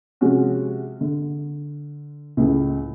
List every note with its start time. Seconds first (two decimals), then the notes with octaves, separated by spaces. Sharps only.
0.21 C3 F3 G#3 C4 C#4 F#4
1.01 D3
2.37 C#2 A2 C#3